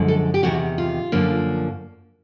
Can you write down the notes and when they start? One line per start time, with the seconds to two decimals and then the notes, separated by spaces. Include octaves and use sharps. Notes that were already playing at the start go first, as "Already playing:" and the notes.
Already playing: F#2 D3 F3 G#3
0.08 A4
0.34 G4
0.43 E2 C3 D#3 F#4
0.78 F4
1.12 F#2 D3 F3 A#3 D4